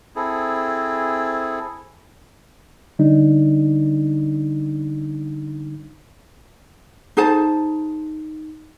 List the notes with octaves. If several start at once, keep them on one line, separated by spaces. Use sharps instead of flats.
C4 E4 G#4 A4
D3 G3 D4 D#4
D#4 G#4 C5 A5